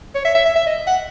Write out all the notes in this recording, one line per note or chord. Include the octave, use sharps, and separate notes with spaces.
C#5
E5
E5
E5
E5
D#5
F#5